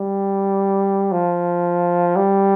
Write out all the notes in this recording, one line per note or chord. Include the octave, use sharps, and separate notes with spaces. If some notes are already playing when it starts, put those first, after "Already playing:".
Already playing: G3
F3
G3